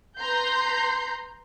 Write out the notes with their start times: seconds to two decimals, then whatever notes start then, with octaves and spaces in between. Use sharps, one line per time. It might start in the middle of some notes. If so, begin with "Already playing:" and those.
0.19 B4 A#5 C6 G6